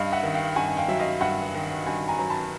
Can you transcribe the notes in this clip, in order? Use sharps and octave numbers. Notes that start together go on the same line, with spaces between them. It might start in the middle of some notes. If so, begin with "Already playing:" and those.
Already playing: G2 D#5 F5
E5 F#5
D#3
F5 G5
G2 F#5 G#5
G#5
F5 G5
F#3 E5
D#5 F5
G2 E5 F#5
D#3
G2 F#5 G#5
G#5 A#5
F#3 A#5
A5 B5